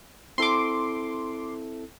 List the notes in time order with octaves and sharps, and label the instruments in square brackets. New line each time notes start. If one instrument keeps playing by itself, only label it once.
[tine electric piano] C4 E4 A4 [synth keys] C6 D6